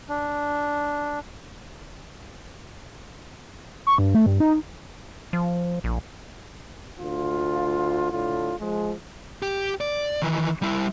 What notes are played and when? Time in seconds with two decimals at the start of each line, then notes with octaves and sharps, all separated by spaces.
0.09 D4
3.87 C#6
3.98 G2
4.15 A3
4.26 G2
4.40 D#4
5.33 F3
5.84 A#1
6.99 D2 F4
8.11 A2 D3 F4
8.60 F3 G#3
9.42 G4
9.81 D5
10.22 D#3 E3
10.62 G3 E4